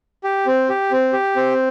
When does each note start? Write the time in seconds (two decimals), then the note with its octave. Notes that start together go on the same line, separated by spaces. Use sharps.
0.24 G4
0.47 C4
0.69 G4
0.92 C4
1.13 G4
1.36 C4